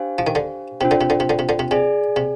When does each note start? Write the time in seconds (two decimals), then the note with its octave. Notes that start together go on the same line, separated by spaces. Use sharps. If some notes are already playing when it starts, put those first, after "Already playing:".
Already playing: D4 G4 C5 F5 G#5
0.18 F3
0.27 D#3
0.35 D3
0.81 C3 D4 F4 C5 G5
0.91 D3
1.01 C3
1.10 D3
1.20 C3
1.29 D3
1.39 C3
1.49 D3
1.59 C3
1.71 C3 G#4 D5 G#5
2.16 C3